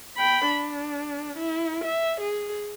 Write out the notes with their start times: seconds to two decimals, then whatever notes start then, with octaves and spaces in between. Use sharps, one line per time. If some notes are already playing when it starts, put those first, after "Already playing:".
0.17 G5 B5
0.47 D4
1.38 E4
1.84 E5
2.21 G#4